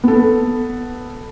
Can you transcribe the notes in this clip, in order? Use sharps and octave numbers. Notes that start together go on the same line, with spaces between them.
B3 A4